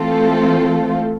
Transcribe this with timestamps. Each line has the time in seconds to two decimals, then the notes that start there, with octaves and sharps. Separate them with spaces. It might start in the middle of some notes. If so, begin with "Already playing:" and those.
Already playing: E3 A3 C4 F4 A4